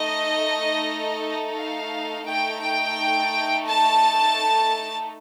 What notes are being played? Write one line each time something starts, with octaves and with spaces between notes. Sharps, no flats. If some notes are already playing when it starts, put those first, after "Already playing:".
Already playing: A3 D#4 A4 D#5
F5
A3 D#4 A4 G5
G5
A5